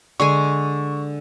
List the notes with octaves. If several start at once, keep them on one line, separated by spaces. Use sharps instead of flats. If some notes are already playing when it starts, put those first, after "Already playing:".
D3 G#3 G#5 C#6